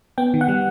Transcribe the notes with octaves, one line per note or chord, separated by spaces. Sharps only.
B3 G5
D#3
F#5
G3